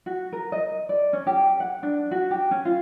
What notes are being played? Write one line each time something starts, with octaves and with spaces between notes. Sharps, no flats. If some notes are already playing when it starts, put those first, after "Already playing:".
F#4
A#4
D#5
D5
C#4
G4
F#5
D4
F#4
G4
C#4
F4